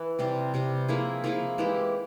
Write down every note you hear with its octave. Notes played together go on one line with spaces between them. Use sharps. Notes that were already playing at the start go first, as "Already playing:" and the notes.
Already playing: E3 E4
C3 G3 C4
C3 G3 C4
F3 A#3 E4 G#4
F3 A#3 E4 G#4
E3 G#3 E4 G4